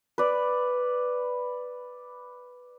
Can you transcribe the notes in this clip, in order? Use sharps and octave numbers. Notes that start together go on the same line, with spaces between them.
B4 D5